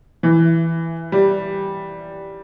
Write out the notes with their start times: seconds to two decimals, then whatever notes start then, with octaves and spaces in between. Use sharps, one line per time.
0.23 E3
1.12 G3